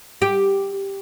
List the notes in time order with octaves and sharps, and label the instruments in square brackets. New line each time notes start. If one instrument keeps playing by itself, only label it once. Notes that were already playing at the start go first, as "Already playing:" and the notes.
[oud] G4